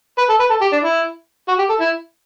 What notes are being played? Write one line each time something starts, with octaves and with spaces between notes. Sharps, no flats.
B4
A4
B4
A4
G4
D4
E4
F#4
G4
A4
E4